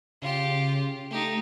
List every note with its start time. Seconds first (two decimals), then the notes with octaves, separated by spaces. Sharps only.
0.22 C#3 F4 G4
1.11 A3 D#4 G4